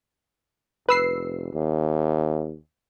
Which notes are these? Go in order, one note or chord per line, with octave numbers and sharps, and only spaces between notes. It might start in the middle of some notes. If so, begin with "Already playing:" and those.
F1 B4 E6 C7
D#2